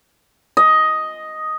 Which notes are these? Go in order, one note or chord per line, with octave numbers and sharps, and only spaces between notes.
D#5